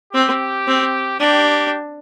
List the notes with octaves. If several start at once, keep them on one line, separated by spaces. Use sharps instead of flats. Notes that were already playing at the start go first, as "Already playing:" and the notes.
C4 G4
C4
D4 G4